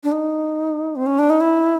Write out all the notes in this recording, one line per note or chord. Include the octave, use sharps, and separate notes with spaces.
D4
D#4
C4
C#4
D4
D#4
E4